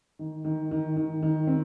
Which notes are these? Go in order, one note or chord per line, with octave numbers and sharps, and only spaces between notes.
D#3
D#3
D#3
D#3
D#3
C4